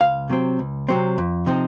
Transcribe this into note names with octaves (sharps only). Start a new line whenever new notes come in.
C#2 F5
C3 F#3 C4
C#2
C3 F#3 C4
F2
C3 F3 C4 D#4